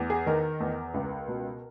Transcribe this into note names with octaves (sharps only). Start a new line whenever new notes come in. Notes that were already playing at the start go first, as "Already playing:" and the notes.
Already playing: E2
G#4
D#3 A#4
E2
C#2
B2